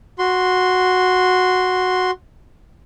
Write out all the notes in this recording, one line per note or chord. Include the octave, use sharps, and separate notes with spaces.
F#4 C6